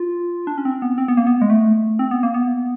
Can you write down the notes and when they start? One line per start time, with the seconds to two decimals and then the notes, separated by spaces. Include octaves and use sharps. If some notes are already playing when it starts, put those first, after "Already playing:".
Already playing: F4
0.47 D4
0.58 C#4
0.65 C4
0.82 B3
0.98 C4
1.08 B3
1.17 A#3
1.27 B3
1.42 G#3
1.50 A3
1.99 C4
2.11 B3
2.23 A#3
2.34 B3